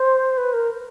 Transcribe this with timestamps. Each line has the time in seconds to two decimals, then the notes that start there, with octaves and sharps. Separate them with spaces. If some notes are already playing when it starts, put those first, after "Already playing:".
Already playing: C5
0.38 B4
0.53 A#4